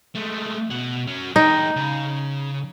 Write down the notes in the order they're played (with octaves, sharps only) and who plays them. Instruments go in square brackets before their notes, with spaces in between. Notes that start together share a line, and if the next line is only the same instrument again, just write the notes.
[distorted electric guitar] G#3 A3
B2 F#5
F#3 C#4
[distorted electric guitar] G#3 G5 [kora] D#4
[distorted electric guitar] C#3